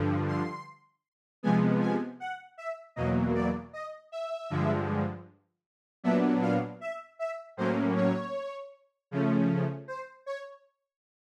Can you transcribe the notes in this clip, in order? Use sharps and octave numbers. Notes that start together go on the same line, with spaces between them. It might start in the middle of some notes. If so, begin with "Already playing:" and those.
Already playing: G2 D3 F3
C6
C3 F3 G#3 B3 G#5
G#5
F#5
E5
E2 B2 F#3 A#3 D#5
D5
D#5
E5
G2 D3 F3 G#3
A#2 F#3 B3 D4 E5
F5
E5
E5
A2 F#3 A#3 C#4 C5
C#5
C#3 F3 A3 C#4
C5
C#5